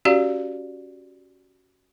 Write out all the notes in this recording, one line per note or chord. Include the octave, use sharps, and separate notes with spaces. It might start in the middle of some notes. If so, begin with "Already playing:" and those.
C#4 F#4 G4 D5 F5